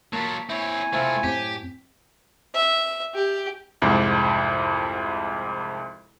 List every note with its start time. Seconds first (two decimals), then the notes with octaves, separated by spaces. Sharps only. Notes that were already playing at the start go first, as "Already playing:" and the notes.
0.13 F#3 A#3 F4 A5 A#5 B6
0.50 C4 E4 C#5 G#5
0.93 C3 A3 C4 E4 F4
1.24 F#2 A2 C4 G4 B6
2.54 E5
3.15 G4
3.82 C2 F2 G#2